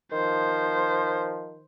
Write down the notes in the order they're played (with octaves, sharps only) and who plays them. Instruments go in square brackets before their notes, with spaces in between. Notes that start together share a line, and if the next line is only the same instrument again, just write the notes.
[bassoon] D#3 [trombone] F3 [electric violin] C5